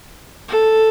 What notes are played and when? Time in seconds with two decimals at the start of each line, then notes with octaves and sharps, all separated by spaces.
0.48 A4